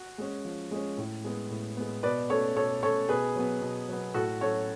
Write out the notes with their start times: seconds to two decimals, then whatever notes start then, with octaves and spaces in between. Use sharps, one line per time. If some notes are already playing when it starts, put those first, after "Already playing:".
Already playing: F#4
0.18 G#3 C#4
0.45 F3
0.71 G#3 C#4
0.98 A2
1.24 G#3 B3
1.50 A2
1.77 G#3 B3
2.03 B2 B4 D5
2.30 A3 C#4 A4 C#5
2.56 B2 A4 C#5
2.83 A3 C#4 A4 C#5
3.09 B2 G#4 B4
3.35 F#3 B3
3.62 B2
3.89 F#3 B3
4.14 A2 F#4 A4
4.41 F#3 A3 C#4 A4 C#5